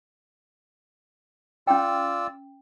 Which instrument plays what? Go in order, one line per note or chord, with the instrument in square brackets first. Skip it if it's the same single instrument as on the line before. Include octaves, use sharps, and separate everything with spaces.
[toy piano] C#4 G5 [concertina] F4 D5 E6